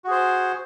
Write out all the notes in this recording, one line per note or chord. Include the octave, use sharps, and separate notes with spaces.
F#4 G#4 C5